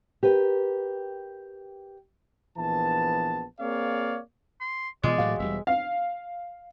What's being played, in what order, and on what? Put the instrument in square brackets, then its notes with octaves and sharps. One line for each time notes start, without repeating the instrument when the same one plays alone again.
[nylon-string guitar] G4 A#4 B4 G5
[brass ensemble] A#1 E3 B3 A5
A#3 C4 G#4 C#5 D5 F5
[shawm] C6
[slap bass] B2 E3 B3 [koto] G#3 [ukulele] F4 [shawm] D5
[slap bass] A2 E3 F#3 [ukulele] F#4 G4 F5
[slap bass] E1 G3 [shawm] E5
[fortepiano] F5